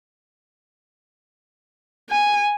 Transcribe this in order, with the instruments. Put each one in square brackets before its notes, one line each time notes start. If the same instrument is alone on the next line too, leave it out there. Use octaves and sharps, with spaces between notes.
[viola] G#5